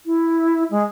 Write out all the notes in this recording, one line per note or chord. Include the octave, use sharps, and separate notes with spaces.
E4
G#3